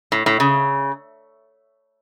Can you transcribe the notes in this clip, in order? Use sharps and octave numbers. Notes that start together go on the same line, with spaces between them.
A2
A2
C#3